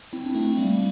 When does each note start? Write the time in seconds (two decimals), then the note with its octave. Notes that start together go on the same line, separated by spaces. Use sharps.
0.13 C4 E4
0.25 D4
0.35 A3 C4
0.57 G3 A#3